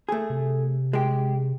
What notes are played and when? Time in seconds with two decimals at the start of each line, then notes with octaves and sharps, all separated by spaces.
0.09 A3 G#4
0.30 C3
0.93 G#3 G4